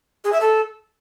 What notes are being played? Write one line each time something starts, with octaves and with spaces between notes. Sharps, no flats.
G#4
E5
A4